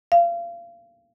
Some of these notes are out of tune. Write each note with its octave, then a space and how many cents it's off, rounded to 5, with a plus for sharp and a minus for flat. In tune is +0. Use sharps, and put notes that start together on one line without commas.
F5 -30